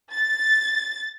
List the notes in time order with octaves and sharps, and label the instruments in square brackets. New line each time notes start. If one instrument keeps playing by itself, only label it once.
[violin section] A6